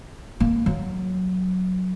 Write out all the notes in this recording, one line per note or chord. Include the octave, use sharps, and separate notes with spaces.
A#3
F#3